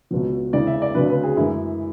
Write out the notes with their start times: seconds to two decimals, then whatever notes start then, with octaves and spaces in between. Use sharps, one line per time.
0.11 C#2 B2 F#3
0.53 E2 C#3 E3 G#3 D5
0.67 E5
0.82 D5
0.95 D2 C#3 F#3 B4
1.10 B4
1.23 G#4
1.37 F#2 E3 G#3 E4